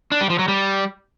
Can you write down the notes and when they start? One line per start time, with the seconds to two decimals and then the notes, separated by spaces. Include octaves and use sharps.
0.12 D4
0.21 G3
0.30 F3
0.39 F#3
0.48 G3